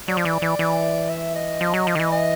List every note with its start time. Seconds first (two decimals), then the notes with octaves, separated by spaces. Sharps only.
0.08 F#3 D5
0.17 F3
0.25 E3
0.42 E3
0.59 E3
1.10 E5
1.35 D#5
1.61 F3
1.74 F#3
1.87 F3
1.95 D#3
1.99 E3
2.12 D#5